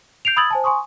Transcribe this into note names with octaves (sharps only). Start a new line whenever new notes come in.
G6 C7 D7 F7
B5 D#6 E6 G#6 A6 F#7
C5 G#5 A5
G#5 C6 C#6 D#6